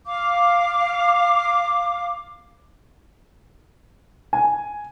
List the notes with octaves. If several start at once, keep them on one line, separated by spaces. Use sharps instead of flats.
F5 D6
G#5